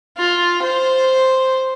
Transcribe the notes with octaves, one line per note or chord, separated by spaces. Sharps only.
F4
C5